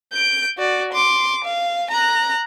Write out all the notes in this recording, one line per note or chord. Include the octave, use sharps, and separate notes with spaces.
G6 D7
F#4 D5
C6 D6
F5
A#5 F#6